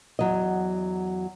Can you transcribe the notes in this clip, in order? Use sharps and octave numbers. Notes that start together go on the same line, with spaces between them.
E2 F#3 D#5